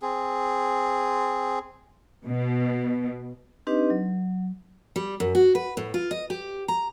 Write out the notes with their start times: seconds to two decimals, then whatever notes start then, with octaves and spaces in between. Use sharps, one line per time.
0.02 C4 G#4
2.25 B2
3.67 C4 D4 D#4 G4 B4 D#5
3.90 F#3
4.96 G3
5.20 F#2
5.35 F#4
5.55 B4
5.77 A2
5.94 F4
6.11 D#5
6.30 G4
6.68 A#5